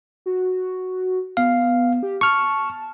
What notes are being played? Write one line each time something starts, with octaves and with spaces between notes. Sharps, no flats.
F#4
B3 F5
G4
A5 C#6 F6